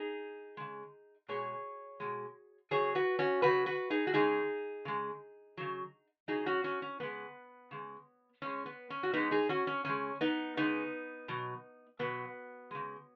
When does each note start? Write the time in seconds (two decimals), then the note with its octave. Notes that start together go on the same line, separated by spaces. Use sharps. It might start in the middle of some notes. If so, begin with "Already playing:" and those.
Already playing: D#4 G#4
0.57 C#3 G#3
1.28 B2 G#3 G#4 C#5
2.00 B2 G#3
2.71 C#3 F#3 G#4 C#5
2.95 F#4 B4
3.19 C#4 F#4
3.42 C#3 F#3 F#4 B4
3.66 F#4 B4
3.90 D#4 G#4
4.07 F#4
4.14 C#3 G#3 D#4 G#4
4.85 C#3 G#3
5.57 C#3 F#3
6.28 C#3 F#3 D#4 G#4
6.46 C#4 F#4
6.64 C#4 F#4
6.82 C#4
7.00 C#3 G#3 B3
7.71 C#3 G#3
8.42 C#3 G#3 C#4
8.66 B3
8.90 C#4
9.03 F#4
9.13 C#3 G#3 B3 D#4
9.31 D#4 G#4
9.49 C#4 F#4
9.67 C#4
9.85 C#3 G#3 C#4
10.21 B3 D#4
10.57 C#3 G#3 B3 D#4
11.28 B2 F#3
11.99 B2 F#3 B3
12.71 C#3 G#3